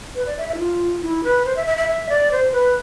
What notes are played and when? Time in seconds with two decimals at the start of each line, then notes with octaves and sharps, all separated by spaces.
0.15 B4
0.26 D5
0.38 E5
0.49 E5
0.54 E4
0.59 F4
1.02 E4
1.24 B4
1.45 C5
1.56 E5
1.66 E5
1.78 E5
1.88 E5
2.09 D5
2.32 C5
2.53 B4